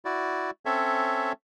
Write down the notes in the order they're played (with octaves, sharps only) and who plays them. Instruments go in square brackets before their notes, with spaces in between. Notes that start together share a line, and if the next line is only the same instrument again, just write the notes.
[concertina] E4 F#4 D5
C4 C#4 A4 C#5 E5